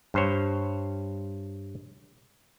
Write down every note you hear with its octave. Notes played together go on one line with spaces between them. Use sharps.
G2 C5 C#5